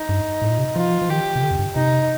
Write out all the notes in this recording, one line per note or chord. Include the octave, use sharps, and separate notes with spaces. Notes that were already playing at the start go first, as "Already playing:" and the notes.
Already playing: D#4
G2
A2
A#2
C3
F3 F4
F3
D#3 G4
C3
D3
F2
G2
C3 D#4